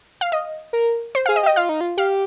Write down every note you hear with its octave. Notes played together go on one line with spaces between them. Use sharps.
F5
D#5
A#4
C5
F5
G#4
D#5
G4
D#5
F4 F5
D#4
F4
G4 F5